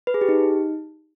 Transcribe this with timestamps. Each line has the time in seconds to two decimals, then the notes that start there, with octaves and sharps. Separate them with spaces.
0.07 B4
0.14 G#4
0.21 G4
0.29 D#4